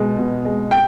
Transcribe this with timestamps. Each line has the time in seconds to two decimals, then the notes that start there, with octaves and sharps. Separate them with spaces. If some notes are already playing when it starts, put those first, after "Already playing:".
Already playing: B2 G#3
0.18 B2
0.45 G#3
0.71 G5